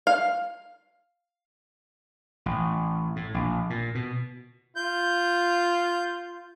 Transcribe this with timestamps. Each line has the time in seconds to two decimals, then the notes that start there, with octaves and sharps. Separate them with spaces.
0.07 F5
2.46 A1
3.16 A2
3.34 A#1
3.70 A#2
3.95 B2
4.76 F4 G6